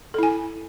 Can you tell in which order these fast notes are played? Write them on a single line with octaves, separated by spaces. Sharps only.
A4 E4 G#5